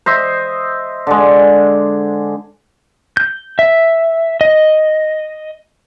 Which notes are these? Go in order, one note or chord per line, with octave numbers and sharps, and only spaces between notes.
C5 D#5 E5
D3 G#3
G6
E5
D#5